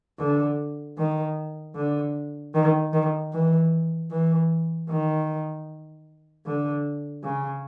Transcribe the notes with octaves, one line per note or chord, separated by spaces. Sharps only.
D3
D#3
D3
D#3
D#3
E3
E3
D#3
D3
C#3